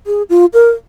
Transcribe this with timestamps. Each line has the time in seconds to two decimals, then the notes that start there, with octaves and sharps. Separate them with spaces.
0.06 G#4
0.29 F4
0.53 A#4